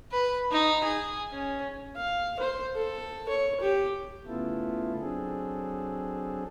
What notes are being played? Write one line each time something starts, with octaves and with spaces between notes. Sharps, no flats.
B4
D#4
G#4
C#4
F5
C5
A4
C#5
G4
C#3 A3 B3 E4 F4 A4
F#3 C4 D4 G#4 A4